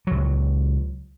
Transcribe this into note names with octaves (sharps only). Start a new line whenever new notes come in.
C#2 F#3